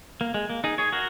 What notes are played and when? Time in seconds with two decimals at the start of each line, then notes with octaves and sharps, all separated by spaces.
0.21 A#3
0.34 G#3
0.50 A#3
0.64 D#4 G#4
0.78 G#4 C#5
0.92 F#4 A#4